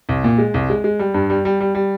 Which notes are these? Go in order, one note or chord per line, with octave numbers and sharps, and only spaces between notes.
C2
A#2
G#3
C2
G#3
G#3
G3
G2
G3
G3
G3
G3